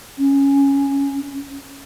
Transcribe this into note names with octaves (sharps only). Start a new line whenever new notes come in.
C#4